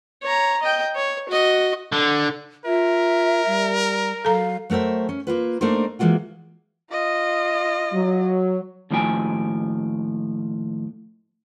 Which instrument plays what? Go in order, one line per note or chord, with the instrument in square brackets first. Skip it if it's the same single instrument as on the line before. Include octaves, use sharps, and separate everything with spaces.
[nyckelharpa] C#5 A#5
D#5 G5
C#5
F#4 D#5
[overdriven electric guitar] D3
[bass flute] F4 [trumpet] A#4 [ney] E5
[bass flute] G3
[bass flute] F#3 [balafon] A4 A#5 [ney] F5
[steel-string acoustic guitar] F#3 A3 A#4 C5 E5
C#4
A#3 F4 B4
A3 A#3 D4 D#4 A#4 C5
E3 G#3 A#3 F4 F#4
[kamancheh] F4 D#5
[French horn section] F#3
[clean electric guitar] D#2 A2 F3 F#4 G5 G#5